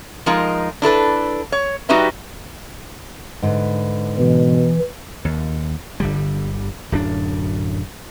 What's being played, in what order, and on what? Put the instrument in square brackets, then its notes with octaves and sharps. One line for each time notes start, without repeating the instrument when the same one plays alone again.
[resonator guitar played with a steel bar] F3 G#3 D#4 A#4
D4 E4 A4 B4
C#5
G3 D#4 F#4 G4 B4 E5
[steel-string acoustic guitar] G#2 D3 B4
[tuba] B2 [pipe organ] E3
[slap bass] D#2
G1 D3 G3
D1 F#2 D4